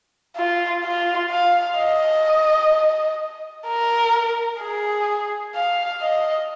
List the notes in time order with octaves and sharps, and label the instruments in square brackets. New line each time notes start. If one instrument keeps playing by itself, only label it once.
[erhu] F4
F4
F5
D#5
A#4
G#4
F5
D#5